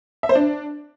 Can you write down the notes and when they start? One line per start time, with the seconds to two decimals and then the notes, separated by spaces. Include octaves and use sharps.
0.23 E5
0.29 C5
0.35 D4